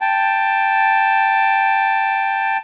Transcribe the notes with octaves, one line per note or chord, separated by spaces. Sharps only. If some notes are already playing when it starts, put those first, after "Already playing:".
G5 A5